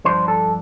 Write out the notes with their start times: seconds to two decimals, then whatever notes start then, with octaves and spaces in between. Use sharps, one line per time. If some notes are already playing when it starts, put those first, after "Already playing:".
0.05 G2 F3 D4 C5
0.28 A4